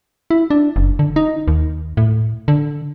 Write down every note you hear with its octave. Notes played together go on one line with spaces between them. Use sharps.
E4
D4
F#1
D3
D#4
D#2
A2
D3